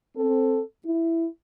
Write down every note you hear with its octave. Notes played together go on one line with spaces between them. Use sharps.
C4 A4
E4